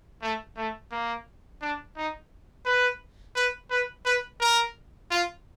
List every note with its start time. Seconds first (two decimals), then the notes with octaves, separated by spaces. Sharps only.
0.22 A3
0.57 A3
0.92 A#3
1.62 D4
1.97 D#4
2.66 B4
3.36 B4
3.70 B4
4.05 B4
4.40 A#4
5.11 F4